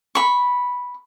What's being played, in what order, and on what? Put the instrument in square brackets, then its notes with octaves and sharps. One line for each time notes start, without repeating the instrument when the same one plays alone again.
[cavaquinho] B5 C#6